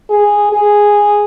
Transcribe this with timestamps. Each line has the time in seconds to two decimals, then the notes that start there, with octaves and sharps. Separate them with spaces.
0.10 G#4
0.53 G#4